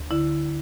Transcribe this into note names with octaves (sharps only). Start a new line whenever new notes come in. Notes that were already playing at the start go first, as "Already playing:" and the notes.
Already playing: D2
D3 E4